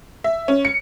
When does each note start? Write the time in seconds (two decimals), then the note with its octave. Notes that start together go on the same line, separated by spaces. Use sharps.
0.24 E5
0.48 C#4
0.65 C#7